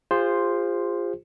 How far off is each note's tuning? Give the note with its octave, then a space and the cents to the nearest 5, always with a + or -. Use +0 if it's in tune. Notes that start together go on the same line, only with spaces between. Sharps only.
F4 +0 G#4 -40 C5 +0